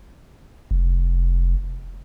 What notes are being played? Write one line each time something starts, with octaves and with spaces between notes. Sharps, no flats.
F1